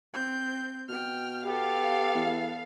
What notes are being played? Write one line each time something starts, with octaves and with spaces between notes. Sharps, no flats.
C4 G6
B2 G5 F6
B3 G4 A4 F5
E2